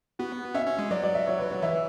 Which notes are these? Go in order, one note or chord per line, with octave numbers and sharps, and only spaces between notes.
B3 F#4
C#4 E5
C#4
G#3
F#3 D5
D5
E5
C#5
B4
C#5
E3 E5